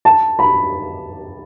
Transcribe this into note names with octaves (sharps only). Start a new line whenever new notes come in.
A5
B5